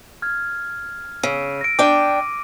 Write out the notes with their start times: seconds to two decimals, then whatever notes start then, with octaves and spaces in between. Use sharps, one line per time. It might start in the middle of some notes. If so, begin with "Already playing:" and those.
0.22 F6 G#6
1.23 C#3 E6 D7 D#7
1.61 A#6 D7
1.79 D4 G5 D6 D#7